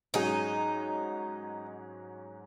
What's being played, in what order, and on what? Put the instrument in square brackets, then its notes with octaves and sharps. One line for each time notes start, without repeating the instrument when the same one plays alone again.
[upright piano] G#2 F#3 C#4 G#4 [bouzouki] D#4